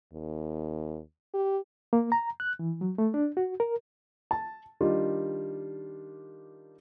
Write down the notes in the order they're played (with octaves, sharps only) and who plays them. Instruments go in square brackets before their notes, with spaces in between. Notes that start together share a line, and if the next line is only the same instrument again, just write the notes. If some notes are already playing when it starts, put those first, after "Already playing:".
[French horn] D#2
G4
[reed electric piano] A#3
A#5
F#6
E3
F#3
A3
D4
F#4
A#4
[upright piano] A5
D#3 G3 D4 D#4 F4